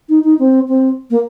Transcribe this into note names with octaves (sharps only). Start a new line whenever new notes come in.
D#4
D#4
C4
C4
A#3